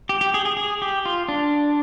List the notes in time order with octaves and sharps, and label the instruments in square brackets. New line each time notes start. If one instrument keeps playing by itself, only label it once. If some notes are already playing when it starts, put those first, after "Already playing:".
[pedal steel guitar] G4
G4
G#4
G#4
G#4
G4
F4
D4